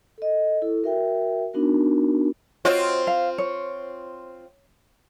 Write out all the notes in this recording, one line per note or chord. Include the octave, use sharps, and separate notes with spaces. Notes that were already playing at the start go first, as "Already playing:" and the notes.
A4 D#5
E4 A4
F#4 A#4 E5 G5
B3 D4 D#4 F#4 A#4
C4 F4 F#4 C#5 D#5
F5
C#5